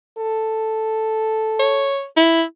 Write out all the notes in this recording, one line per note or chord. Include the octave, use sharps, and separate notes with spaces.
A4
C#5
E4